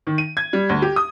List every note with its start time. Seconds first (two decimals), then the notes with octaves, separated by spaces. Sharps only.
0.07 D#3
0.18 D#7
0.37 G#6
0.53 G3
0.69 D2
0.82 G4
0.96 D#6